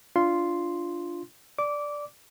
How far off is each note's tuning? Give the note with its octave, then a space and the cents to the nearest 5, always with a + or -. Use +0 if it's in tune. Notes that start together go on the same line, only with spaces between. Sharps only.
D4 +0 F4 -10 C6 +0
D5 +0 D6 -15